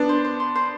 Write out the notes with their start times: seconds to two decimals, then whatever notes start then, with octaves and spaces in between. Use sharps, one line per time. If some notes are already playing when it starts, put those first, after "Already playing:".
Already playing: B3 D4
0.09 C5
0.24 C5
0.40 C6
0.56 C5